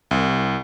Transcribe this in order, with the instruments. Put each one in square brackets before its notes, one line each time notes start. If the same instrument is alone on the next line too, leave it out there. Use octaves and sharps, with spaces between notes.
[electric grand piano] C2